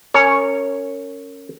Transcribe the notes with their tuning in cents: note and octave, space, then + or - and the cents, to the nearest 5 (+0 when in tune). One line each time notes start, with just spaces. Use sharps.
C#4 +0 A#4 -25 C#5 +0